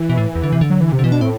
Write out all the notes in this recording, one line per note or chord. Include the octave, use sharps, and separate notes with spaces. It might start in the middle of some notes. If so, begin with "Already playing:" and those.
Already playing: E3
B2
A2
E2
D3
C3
D3
F#3
E3
C3
D3
B2 E3
D4
A2 C4